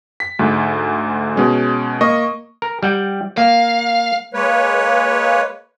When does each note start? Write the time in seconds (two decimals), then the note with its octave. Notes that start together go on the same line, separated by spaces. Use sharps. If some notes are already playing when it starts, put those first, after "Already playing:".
0.20 B6
0.39 D2 G#2
1.36 B2 G#3 C#4
2.01 A#3 D#5 C#6
2.62 A#4
2.83 G3 F#5 G5
3.37 A#3 F5
4.34 G#3 A#3 B4 C#5